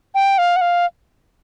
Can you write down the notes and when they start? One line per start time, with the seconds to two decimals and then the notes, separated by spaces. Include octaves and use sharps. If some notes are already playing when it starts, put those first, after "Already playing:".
0.15 G5
0.38 F5
0.56 F#5
0.61 F5